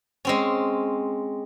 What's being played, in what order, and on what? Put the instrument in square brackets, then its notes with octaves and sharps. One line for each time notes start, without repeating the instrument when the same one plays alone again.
[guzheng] G#3 C4 C#4